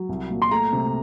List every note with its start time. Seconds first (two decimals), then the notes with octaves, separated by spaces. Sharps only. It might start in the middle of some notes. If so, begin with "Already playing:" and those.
Already playing: F#3
0.09 C2
0.30 A#2
0.42 C6
0.51 A3 A#5
0.73 C3